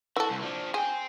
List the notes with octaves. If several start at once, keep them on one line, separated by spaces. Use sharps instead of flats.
E3 F#4 A4
C2
F3 D4
G#4 C5 G5